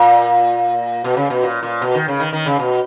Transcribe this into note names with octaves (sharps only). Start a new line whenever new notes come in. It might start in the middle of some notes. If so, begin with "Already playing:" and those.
Already playing: A#2
B2
C#3
B2
A#2
A#2
B2
D#3
C#3
D#3
D#3
C#3
B2